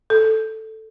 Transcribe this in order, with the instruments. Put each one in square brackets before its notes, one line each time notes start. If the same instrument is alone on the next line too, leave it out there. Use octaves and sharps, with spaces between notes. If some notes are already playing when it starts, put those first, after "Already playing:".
[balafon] A4